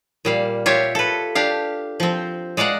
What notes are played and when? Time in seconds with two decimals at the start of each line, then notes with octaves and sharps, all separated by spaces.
0.25 A#2 G3 F5
0.66 F4 G4 C#5 E5
0.95 A4 B4
1.35 D4 G4 F5
2.00 F3 C4
2.57 G#3 D5 F5 F#5 A#5